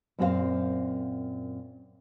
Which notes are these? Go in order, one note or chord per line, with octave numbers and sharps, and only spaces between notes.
F#2 A#2 C4 G#4 C5 F5